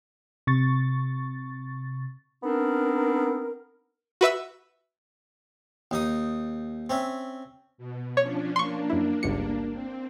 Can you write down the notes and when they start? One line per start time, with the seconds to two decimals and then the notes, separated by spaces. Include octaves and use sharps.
0.47 C3 C#6 A6
2.44 B3 C4 D4 D#4 A#4
4.21 F#4 B4 E5 E6
5.91 D#2 D#4 D#6
6.90 C4 C#4 E5
7.78 B2
8.17 F3 C#4 D4 C#5
8.56 A#3 D4 C6 C#6
8.90 F#2 E4
9.23 G1 C#2 C#7
9.72 C4